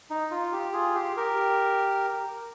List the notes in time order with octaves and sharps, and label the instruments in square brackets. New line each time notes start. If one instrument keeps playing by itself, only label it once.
[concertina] D#4
F4
G4
F4 G#4
G4
G4 A#4